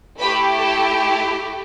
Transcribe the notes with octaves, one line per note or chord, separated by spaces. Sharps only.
A3 E4 G4 B4 B5
A4 A5